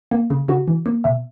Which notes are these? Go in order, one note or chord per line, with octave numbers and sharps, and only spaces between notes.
A#3
C#3
C#3 F#4
E3
A#3
B2 E5